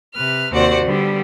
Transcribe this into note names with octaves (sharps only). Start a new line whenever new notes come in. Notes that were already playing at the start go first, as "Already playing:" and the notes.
C3 B4 F6
D#2 C3 F#4 C5 D5 F#5
D3 G3 B3